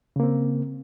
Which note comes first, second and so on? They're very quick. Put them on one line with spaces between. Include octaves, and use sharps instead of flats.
C#3 A#3 C4